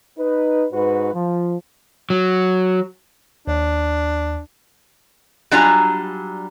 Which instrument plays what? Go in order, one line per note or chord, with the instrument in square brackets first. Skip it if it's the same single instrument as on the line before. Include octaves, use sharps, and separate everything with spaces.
[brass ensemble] D#4 B4
G#2 F#4 B4
F3
[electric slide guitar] F#3
[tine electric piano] D#2 [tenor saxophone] D4
[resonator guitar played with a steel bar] F#3 G3 D4 F4 G#5 A#5